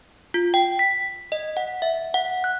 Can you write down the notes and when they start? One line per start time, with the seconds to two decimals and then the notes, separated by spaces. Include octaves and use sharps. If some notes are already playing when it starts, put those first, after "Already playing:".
0.34 F4
0.54 G5
0.79 B6
1.32 D#5
1.57 F#5
1.82 E5
2.14 F#5
2.44 F#6